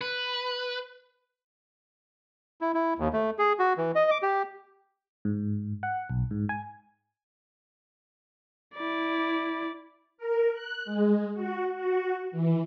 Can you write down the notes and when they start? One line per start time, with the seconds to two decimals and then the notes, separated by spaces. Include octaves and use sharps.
0.01 B4
2.61 E4
2.74 E4
2.99 D#2
3.13 A3
3.39 G#4
3.59 F#4
3.78 E3
3.95 D#5
4.11 D6
4.23 G4
5.25 G#2
5.83 F#5
6.10 B1
6.31 G#2
6.49 G#5
8.76 E4 D5
10.18 A#4
10.53 F#6
10.85 G#3
11.34 F#4
11.75 F#4
12.31 E3